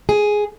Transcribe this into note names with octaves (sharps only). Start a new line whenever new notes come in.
G#4